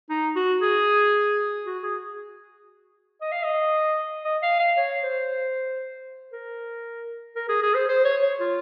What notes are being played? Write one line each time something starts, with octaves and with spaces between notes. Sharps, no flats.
D#4
F#4
G#4
F#4
G#4
D#5
F5
D#5
D#5
F5
F5
C#5
C5
A#4
A#4
G#4
G#4
C5
C5
C#5
C#5
F4